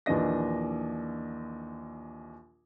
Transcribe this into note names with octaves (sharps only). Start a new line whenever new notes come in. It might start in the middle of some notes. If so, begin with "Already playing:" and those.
A#1 D#2 E3 D4 D#5 A#6